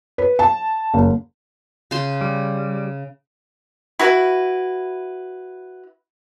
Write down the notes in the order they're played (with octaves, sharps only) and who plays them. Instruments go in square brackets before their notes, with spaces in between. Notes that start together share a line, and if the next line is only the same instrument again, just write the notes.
[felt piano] B4
A5
F#1
[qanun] C#3 C5 C6
[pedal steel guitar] G3
[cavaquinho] E4 F#4 B4